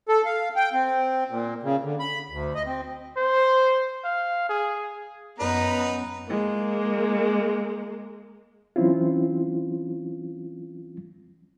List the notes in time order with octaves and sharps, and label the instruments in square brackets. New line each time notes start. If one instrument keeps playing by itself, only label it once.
[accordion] A4
F5
G5
C4
A#2
C#3
D3
B5
D2
D#5
C4
[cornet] C5
F5
G#4
[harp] F#2 [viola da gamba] B3 [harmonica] D#4 B4 [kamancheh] A#5
[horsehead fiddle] G#3 A#3
[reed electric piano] E3 F#3 C4 C#4 E4 F4